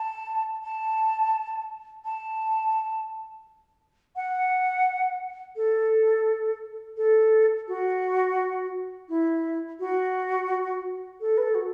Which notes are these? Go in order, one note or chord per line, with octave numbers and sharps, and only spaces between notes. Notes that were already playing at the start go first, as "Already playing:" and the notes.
Already playing: A5
A5
A5
F#5
A4
A4
F#4
E4
F#4
A4
B4
A4
F#4